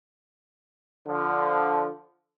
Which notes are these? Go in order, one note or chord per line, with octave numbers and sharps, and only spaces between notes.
D3 F3